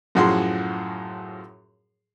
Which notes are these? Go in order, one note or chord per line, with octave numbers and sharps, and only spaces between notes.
F#2 A2 F3 F#4 G#4 C6